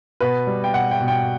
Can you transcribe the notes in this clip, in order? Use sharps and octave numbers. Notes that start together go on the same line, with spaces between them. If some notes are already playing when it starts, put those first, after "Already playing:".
B2 B4
G3
G5
B2 F#5
G5
B2
G5